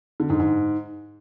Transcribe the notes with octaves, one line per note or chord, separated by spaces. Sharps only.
D3
G#2
G#2